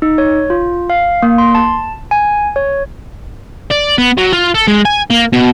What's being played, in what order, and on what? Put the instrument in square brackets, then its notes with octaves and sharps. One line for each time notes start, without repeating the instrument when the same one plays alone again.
[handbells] D#4
C#5
F4
F5
A#3
C6
A5
G#5
C#5
[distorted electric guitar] D5
B3
F#3
F4
A4
G#3
G#5
A#3
B2